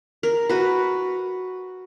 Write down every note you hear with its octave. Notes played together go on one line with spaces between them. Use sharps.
A#4
F#4 B4